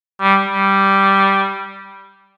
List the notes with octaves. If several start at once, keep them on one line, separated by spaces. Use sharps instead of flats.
G3
G3